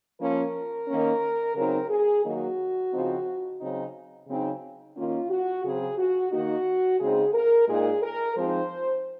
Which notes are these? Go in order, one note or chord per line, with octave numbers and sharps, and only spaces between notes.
F3 A#3 C#4 A#4
D#3 A#3 C#4
C#3 F#3 C4 D#4 A#4
G#4
D#3 F#3 A#3 D#4 F#4
C#3 F3 C4 D#4
C#3 F#3 C4 D#4
C#3 F#3 C4 D#4
D#3 A#3 C#4 F4
F#4
C#3 F#3 C4 G#4
F#4
D#3 A#3 D#4 F#4
C#3 G#3 C4 D#4 G#4
A#4
A#2 G#3 D#4 G#4
A#4
F3 G#3 C4 D#4 C5